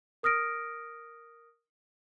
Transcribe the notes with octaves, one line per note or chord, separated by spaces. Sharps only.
A#4 D#6 F6 A#6 D7